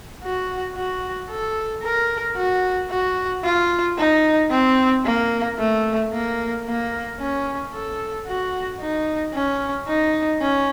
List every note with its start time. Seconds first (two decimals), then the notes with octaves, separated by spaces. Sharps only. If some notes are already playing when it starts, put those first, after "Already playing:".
0.23 F#4
0.75 F#4
1.30 A4
1.83 A#4
2.36 F#4
2.90 F#4
3.44 F4
3.98 D#4
4.51 C4
5.05 A#3
5.58 A3
6.13 A#3
6.66 A#3
7.19 C#4
7.74 A4
8.27 F#4
8.81 D#4
9.34 C#4
9.88 D#4
10.41 C#4